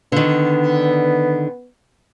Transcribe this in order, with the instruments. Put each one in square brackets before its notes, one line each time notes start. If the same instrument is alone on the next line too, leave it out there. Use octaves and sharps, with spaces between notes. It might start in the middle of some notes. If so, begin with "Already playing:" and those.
[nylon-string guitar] D3 D#3 [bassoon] B3